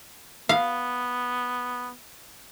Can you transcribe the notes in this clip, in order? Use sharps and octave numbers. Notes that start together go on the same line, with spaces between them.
B3 F5